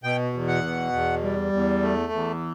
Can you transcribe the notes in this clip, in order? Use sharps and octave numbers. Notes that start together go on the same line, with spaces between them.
B2 G5
E2
F#5
B2
E2
G3
E2
A3
E2